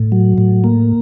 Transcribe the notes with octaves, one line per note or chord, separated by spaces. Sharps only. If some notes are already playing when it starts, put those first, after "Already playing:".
Already playing: A2
F#3
A2
A#3